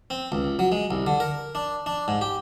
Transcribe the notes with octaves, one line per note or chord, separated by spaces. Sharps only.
C4
C#2
F#3
G#3
C2
D3
A#4
D4
D4
G#2
G4